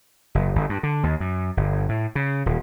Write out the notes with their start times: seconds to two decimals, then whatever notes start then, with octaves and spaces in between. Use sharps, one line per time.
0.35 F#1
0.55 G1
0.69 G2
0.83 D3
1.03 D#2
1.20 F#2
1.57 G1
1.89 A2
2.15 C#3
2.46 D#1